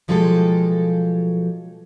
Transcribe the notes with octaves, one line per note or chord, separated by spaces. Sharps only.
B2 F3 F#3 G#3 G4 A4